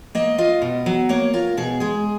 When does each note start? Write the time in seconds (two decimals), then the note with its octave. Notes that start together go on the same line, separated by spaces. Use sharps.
0.15 A#3 D#5
0.38 F4 D#5
0.62 B2
0.86 F#3
1.09 A#3 C#5
1.33 F4 A#4
1.57 B2 G#4
1.80 G#3 G#4